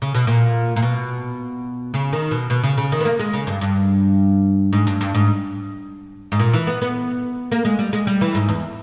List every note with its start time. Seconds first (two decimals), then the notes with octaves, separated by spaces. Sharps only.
0.02 C#3
0.15 B2
0.27 A#2
0.76 A#2
0.83 B2
1.94 C#3
2.13 D#3
2.31 B2
2.50 B2
2.64 C#3
2.78 C#3
2.92 D#3
3.01 B3
3.05 A#3
3.20 G#3
3.33 C#3
3.47 G2
3.61 G2
4.73 G#2
4.87 G2
5.01 G2
5.14 G#2
6.32 G#2
6.39 A#2
6.53 E3
6.67 B3
6.82 B3
7.52 A#3
7.65 G#3
7.79 G3
7.93 G#3
8.07 G3
8.21 E3
8.35 G#2
8.49 E2